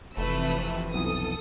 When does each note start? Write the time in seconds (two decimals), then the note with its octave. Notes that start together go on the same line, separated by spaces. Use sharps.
0.17 F1 F2 C3 E3 A3 B4 E6
0.94 B1 F2 E3 A4 D#6